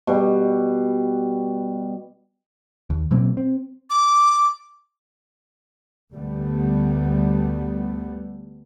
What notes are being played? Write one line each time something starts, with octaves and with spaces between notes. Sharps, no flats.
B2 G3
D#2
B2 F#3 A#3 C4
C4
D6
D2 G3 A3 B3